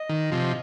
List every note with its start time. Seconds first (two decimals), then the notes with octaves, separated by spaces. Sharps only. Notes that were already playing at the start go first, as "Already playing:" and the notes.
Already playing: D#5
0.09 D#3
0.32 C3 F3